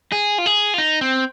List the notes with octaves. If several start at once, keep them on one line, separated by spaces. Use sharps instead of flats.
G#4
F4
G#4
F4
D#4
C4